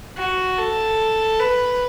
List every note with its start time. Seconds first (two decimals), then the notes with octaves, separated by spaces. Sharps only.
0.17 F#4
0.58 A4
1.40 B4